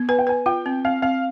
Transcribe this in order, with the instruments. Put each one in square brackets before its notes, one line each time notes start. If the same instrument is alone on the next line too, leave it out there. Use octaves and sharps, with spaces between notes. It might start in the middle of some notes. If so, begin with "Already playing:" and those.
Already playing: [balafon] B3
[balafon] B4 [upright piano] G#5
[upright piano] G5
[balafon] B4 [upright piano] G#5
[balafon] F4 [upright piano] G5
[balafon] C4
[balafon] C4 [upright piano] F5
[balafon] C4 [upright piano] F5